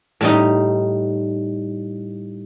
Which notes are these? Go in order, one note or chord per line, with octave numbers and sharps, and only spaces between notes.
A2 G3 D#4